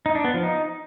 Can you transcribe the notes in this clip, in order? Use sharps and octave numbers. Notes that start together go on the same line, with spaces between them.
D#4
D4
B3
F3
D#4